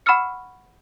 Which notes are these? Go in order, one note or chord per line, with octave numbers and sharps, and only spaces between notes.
F#5 B5 C#6 E6 F6 C#7